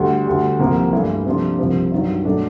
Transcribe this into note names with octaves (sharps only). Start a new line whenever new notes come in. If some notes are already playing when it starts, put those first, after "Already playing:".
Already playing: D2 D3 G3
D2 D3 G3
C2 C3 F3 A#3
G2 E3 A3
C3 F3 A#3 D4 F4
C2 C3 F3
G2 D#3 F#3
B2 F#3 A3 D4